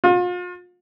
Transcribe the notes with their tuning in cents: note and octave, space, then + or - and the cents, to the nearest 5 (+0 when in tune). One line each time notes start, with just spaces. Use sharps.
F4 +40